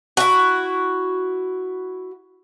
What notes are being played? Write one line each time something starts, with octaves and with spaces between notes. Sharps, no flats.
E4 F#4